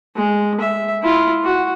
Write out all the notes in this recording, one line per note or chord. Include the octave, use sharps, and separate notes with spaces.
G#3
E5
E4 F4
F#4